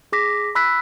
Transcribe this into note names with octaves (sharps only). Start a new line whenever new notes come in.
G#4 D6 A#6 B6
B5 E6 F#6 B6